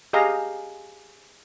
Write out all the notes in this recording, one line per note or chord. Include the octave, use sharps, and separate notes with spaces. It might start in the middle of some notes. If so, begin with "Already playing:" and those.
G4 G#4 D#5 F5 A#5